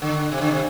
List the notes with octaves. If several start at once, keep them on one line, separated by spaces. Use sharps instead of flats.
D3
C3
D3
C3